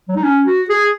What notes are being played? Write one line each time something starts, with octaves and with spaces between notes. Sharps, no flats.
F#3
D#4
C#4
F#4
G#4